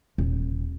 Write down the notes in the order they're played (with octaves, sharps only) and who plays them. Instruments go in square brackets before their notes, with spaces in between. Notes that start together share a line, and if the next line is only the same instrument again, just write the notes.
[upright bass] D#1